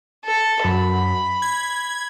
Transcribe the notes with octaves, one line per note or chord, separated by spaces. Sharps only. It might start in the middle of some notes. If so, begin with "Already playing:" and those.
A4
F#2 B5
G#6